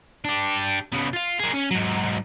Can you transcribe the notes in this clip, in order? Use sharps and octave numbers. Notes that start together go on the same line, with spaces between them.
D4 G4
C#3 B3
F4 F5
A#3 G#4
C#4
G#2 F#3